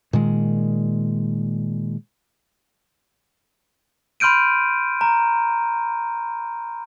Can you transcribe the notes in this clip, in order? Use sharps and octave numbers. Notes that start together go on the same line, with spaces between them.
A#2 D#3 G#3
B5 C6 F6 G6 D7 D#7
A#5